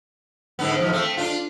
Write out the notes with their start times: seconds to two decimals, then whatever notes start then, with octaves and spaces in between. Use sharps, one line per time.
0.59 G#2 D3 B3
0.78 E2 G#2 F3
0.92 A3 C4
1.17 D4 F4